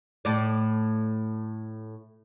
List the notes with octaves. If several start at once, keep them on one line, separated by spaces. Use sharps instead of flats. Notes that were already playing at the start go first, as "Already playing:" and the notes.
A2 D5